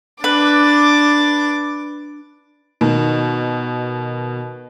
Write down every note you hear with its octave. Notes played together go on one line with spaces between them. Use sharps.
D4 B4 D6 A6
B2 D#3